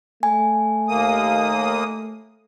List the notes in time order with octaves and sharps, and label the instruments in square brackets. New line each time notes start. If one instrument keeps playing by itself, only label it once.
[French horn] A3 [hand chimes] G#5
[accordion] D#2 A#3 D#6